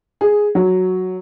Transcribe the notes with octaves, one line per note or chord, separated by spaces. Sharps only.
G#4
F#3